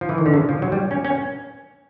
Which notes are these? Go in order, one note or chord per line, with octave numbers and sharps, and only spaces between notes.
F3
E3
D#3
D3
C#3
F3
F#3
G3
C#4
C#4